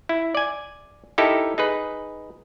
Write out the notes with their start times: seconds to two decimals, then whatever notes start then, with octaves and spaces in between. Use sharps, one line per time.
0.09 E4
0.35 D5 G#5
1.18 D#4 E4 G4 A4 A#4
1.58 D#4 G#4 B4